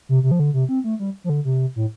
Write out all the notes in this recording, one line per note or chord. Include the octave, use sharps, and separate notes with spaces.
C3
C3
F3
D3
C3
C4
A3
G3
F3
D3
C3
A2